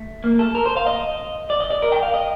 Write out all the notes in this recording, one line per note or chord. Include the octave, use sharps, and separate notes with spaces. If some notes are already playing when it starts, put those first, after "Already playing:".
Already playing: A3
A#3
A4
A#4
C5
F5
D#5
D5
D#5
D5
A#4
G5
F5
D#5